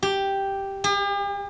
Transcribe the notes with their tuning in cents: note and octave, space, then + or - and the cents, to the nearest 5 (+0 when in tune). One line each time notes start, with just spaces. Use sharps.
G4 +0
G4 +45